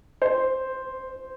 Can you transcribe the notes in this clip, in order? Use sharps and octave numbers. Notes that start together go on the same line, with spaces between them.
C5